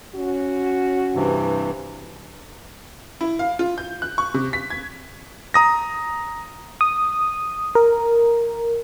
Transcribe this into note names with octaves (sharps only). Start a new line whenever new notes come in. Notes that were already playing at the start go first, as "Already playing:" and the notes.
C#4 F#4
G2 C3 E3
E4
F5
F4
G6
F#6
C#6
C3
B6
G#6
A#5 D#6 A#6
D#6
A#4